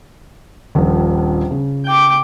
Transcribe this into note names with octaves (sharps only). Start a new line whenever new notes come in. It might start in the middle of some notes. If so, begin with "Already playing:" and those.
D#1 A#1 F3
C#3
G5 D6